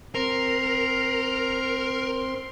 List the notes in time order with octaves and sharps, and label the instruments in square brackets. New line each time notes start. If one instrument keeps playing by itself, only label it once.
[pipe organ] C4 C6 [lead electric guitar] A#4